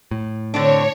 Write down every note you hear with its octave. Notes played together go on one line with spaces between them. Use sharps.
A2
D3 C4 D4 C#5